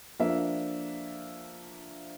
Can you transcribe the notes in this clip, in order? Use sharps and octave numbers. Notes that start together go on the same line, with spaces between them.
F3 A#3 D4 A4 E5